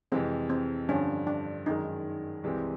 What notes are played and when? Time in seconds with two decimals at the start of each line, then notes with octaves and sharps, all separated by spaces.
0.12 F2 C3 E3 G#3 C4
0.50 C4
0.89 G2 D3 F3 C#4
1.27 D4
1.66 F#2 D#3 G#3 D#4
2.43 C2 C3 E3 G#3 C4